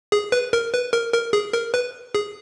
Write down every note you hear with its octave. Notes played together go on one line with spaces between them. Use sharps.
G#4
B4
A#4
B4
A#4
A#4
G#4
A#4
B4
G#4